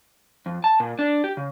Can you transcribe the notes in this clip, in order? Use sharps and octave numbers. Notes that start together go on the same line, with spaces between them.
F2
A5
A#2
D4
G4
C#3